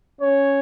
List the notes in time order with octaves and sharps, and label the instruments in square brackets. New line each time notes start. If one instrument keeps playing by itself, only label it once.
[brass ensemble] C#4 C#5